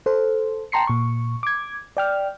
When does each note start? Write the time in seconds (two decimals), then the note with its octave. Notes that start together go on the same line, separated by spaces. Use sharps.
0.06 A4 C5
0.72 G5 A5 A#5 C6 C7 C#7
0.87 A#2 C#6
1.43 D6 G#6
1.97 D5 G5 F6